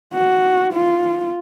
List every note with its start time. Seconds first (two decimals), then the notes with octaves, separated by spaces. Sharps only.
0.14 F#4
0.73 F4